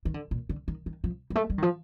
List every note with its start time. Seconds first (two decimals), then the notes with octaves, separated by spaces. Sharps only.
0.05 D#3
0.14 D3
0.31 A#2
0.49 D3
0.68 D#3
0.86 D#3
1.04 F3
1.30 G3
1.35 A3
1.50 G3
1.58 D#3
1.62 F3